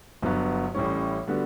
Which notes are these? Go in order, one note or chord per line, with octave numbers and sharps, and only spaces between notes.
G1 G2 F#3 B3 F#4
A1 A2 G3 C#4
D3 G3 B3 F#4